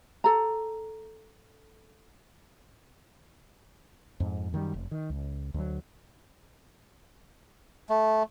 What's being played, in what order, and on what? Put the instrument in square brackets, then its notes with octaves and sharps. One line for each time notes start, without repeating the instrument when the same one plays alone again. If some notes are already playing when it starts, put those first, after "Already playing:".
[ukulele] A4 A#5
[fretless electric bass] F2 G#2
F#2 D#3 F#3 G3
F1
D#3
C#2
D2 F#3
[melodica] A3